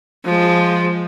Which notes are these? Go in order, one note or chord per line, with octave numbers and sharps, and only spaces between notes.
F3 G#3